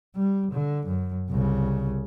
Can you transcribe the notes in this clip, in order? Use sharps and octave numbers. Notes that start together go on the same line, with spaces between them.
G3
D3
F#2
C2 C#3